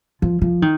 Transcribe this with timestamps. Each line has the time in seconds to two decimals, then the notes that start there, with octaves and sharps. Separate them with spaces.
0.22 F3
0.42 F3
0.62 D#3